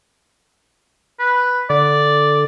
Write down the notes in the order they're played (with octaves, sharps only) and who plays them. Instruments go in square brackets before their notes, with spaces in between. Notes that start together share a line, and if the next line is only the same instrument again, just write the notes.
[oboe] B4
[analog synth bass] D3 [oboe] D5